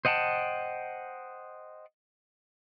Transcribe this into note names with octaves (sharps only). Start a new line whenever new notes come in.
C5 D#5 F#5 G5 A5